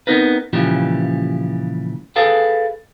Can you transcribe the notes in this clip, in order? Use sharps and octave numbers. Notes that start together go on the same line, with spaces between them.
B3 C4 D#4 A#4 B4
A#2 C#3 E3 F3 G3 G4
G#4 A4 B4 F5 G5